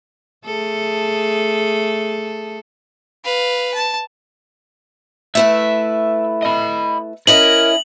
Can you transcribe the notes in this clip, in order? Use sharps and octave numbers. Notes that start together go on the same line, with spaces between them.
A3 G#4 A4
B4 F5
A5
A3 E4 B4 E5
D#5 B5
C#4 E4 A#4 D#5 F#7